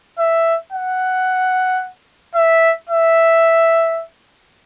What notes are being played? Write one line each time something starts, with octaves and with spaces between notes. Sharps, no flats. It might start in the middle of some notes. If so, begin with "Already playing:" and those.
E5
F#5
E5
E5